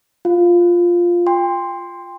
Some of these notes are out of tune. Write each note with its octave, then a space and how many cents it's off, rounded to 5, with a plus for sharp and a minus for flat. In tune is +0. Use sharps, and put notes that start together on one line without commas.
F4 +0 F5 +0
G5 +30 C6 +0